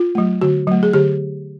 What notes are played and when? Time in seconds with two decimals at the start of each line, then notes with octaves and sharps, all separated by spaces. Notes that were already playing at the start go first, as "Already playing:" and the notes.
Already playing: F4
0.15 F#3 A3
0.42 D3 F#4
0.67 F#3 A3
0.83 G#4
0.93 D3 G4